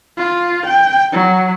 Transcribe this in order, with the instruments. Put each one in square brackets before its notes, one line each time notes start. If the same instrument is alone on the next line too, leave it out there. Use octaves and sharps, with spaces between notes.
[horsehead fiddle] F4
G5
F#3